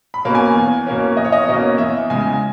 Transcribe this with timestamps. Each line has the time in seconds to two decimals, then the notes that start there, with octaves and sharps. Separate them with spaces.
0.14 B5
0.25 B2 A#3 C#4
0.35 G#5
0.55 E2
0.86 B2 A#3 C#4
1.17 E2 D#5
1.25 C#5
1.32 D#5
1.48 B2 A#3 C#4
1.78 E2 E5
2.10 C#3 G#3 G#5